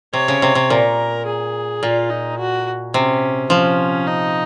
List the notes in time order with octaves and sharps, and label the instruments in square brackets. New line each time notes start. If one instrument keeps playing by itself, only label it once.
[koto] C3 [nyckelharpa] C#5
[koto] C#3
C3
C3
[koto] A#2 [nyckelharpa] A#4
[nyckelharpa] G#4
[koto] A#2 [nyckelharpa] F4
[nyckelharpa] D#4
F#4
[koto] C3 [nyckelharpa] C#4
[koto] F3 [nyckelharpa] C#4
[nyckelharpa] D#4